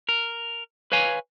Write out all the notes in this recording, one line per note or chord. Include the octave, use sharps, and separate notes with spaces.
A#4
B4 C#5 F5 G#5